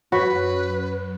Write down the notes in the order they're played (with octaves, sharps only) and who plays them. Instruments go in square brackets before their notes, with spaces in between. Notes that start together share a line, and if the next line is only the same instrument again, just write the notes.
[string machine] F#2 [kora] F#4 [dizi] B4 [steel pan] C#5 F#5 B5